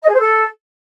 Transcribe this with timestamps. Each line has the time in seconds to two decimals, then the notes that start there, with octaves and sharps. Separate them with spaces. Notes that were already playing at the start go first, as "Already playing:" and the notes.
0.02 D#5
0.08 G#4
0.14 C5
0.19 A4